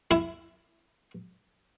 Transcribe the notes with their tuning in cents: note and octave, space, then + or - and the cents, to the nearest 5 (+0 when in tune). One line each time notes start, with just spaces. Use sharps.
E4 +20